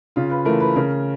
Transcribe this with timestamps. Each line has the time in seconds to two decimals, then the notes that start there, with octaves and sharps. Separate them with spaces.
0.16 C#3 F4
0.30 B4
0.45 E3 A3 A#4
0.60 B4
0.76 C#3 A#4